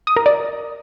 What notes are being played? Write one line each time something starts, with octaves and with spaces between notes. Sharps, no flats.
D#6
A#4
D5